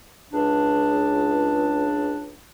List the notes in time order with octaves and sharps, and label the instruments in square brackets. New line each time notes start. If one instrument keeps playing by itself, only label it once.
[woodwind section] C#2 D4